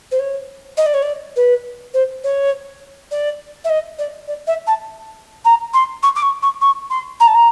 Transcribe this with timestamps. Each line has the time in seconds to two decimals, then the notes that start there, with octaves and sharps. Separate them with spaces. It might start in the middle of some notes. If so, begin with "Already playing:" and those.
0.11 C5
0.19 C#5
0.77 D#5
0.86 D5
0.94 C#5
1.02 D5
1.36 B4
1.94 C5
2.24 C#5
3.11 D5
3.64 E5
3.69 D#5
3.98 D5
4.28 D5
4.47 E5
4.67 A5
5.45 A#5
5.73 C6
6.03 C#6
6.15 D6
6.22 C#6
6.42 C#6
6.61 C#6
6.90 C6
7.20 A#5
7.27 A5
7.34 A#5